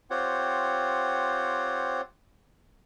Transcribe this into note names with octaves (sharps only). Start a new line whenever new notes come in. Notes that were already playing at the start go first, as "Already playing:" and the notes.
C4 F4 G4 C5 C#5 F#5